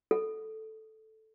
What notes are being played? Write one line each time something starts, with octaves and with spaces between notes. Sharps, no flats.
A4